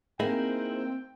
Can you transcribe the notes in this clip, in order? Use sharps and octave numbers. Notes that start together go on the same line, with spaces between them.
A#3 C4 D#4 E4 G#4 G5